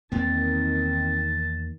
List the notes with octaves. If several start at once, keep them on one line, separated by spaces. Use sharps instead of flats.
E2 D#3 A#3 C4 A5